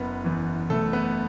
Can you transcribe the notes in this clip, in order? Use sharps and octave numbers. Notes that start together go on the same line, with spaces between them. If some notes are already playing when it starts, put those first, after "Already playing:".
Already playing: F#1 B3 B4
E2 E3
F#1 A3 A4
B3 B4